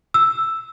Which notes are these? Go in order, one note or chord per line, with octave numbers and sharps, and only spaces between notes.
E6